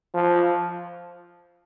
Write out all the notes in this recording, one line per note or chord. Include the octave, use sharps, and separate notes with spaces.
F3